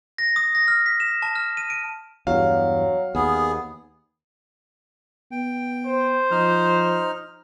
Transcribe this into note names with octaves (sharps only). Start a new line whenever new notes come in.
A#6
D#6
A#6
F6
B6
E7
A5
F6
D#7
D7
E2 G2 F#3 F5
D#2 B3 G#4
B3 G5
C5
F3 D#4 F6